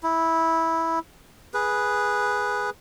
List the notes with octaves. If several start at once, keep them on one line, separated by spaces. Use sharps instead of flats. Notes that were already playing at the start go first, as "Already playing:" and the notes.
E4
G#4 B4